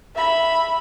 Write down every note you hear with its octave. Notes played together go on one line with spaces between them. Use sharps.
E5 B5